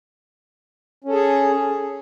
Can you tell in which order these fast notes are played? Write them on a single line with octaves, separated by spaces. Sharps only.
C#4 A4 G#4